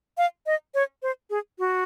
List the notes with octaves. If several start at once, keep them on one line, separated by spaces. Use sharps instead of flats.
F5
D#5
C#5
C5
G#4
F#4